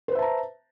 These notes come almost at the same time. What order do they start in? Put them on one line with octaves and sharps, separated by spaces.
C5 B4 E5 A5 A#5